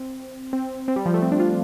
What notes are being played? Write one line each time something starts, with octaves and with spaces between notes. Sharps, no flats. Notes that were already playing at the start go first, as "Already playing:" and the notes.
Already playing: C4
C4
C4
G3
F3
A3
C4
D4
F4